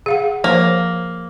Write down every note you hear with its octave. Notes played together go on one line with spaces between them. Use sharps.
G#4 F5 F#5
F3 A#3 C5